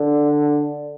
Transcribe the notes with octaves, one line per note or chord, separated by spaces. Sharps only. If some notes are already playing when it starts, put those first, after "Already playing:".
Already playing: D3